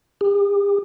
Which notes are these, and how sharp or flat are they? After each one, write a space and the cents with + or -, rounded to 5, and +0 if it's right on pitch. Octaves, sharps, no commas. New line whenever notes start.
G4 +45